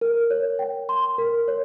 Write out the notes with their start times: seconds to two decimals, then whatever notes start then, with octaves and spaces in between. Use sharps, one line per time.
0.01 A#4
0.30 C#5
0.59 G5
0.89 C6
1.18 A#4
1.48 C#5